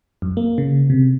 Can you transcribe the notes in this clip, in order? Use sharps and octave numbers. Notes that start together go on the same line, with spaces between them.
F#2
A#3
C#3
C3